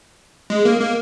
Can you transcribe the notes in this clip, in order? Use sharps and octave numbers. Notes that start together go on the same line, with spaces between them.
G#3
A#3
A#3